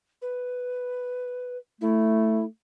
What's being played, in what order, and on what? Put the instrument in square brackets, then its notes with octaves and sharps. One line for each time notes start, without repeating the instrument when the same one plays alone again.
[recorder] B4
[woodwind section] A3 [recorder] E4